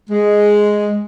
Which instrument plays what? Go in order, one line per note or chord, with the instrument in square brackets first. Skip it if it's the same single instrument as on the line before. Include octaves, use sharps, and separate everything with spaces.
[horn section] G#3